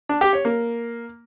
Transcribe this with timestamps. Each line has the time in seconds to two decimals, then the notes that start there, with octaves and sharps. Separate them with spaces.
0.09 D4
0.21 G4
0.33 C#5
0.45 A#3